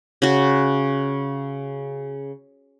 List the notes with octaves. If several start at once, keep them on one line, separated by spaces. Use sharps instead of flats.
C#3 F#4